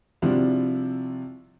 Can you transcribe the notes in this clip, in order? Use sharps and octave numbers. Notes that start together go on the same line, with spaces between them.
C3 F3 G3 D4 E4 F#4